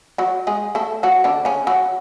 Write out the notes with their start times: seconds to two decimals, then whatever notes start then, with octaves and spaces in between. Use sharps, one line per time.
0.18 F#3 F#4
0.47 G#3 G#4
0.75 A3 A4
1.03 F#3 F#4
1.24 D3 D4
1.45 C#3 C#4
1.67 F#3 F#4